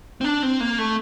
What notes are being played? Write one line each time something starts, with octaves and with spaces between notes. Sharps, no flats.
C4
D4
C4
A#3
A3